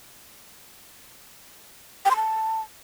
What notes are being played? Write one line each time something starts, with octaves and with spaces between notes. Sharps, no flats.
G5
C6
A5